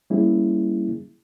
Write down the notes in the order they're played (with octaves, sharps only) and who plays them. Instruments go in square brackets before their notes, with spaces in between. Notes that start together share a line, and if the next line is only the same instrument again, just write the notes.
[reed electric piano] G3 A#3 C#4 E4 G#4